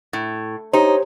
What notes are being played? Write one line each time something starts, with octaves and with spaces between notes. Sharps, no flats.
A2
D#4 G4 C5 C#5